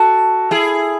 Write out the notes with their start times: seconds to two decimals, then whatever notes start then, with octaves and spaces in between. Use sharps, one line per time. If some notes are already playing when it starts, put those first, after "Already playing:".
Already playing: F#4 A4
0.51 E4 G#4